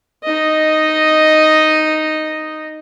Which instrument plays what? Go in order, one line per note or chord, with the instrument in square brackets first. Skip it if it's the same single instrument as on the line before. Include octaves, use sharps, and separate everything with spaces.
[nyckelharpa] D#4 D#5